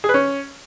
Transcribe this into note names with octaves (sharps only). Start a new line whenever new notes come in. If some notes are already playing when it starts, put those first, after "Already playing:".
G#4
B4
C#4